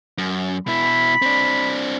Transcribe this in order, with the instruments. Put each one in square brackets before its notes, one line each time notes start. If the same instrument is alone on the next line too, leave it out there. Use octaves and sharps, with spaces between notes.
[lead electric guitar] F#2
[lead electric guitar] B2 E4 [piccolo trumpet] B5
[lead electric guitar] C4 D4